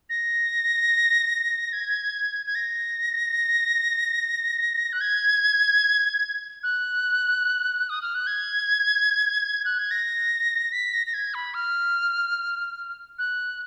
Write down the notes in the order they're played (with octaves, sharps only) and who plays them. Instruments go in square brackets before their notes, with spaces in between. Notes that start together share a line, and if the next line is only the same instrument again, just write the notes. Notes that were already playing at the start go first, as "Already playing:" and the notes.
[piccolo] A#6
G#6
G#6
A#6
F#6
G#6
F#6
D#6
F6
F#6
G#6
F#6
G#6
A#6
B6
A#6
A#6
G#6
B5
F6
F#6